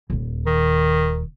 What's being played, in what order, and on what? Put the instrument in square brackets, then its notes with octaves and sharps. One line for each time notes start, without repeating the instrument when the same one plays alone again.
[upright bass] D#1 D#2
[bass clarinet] D#3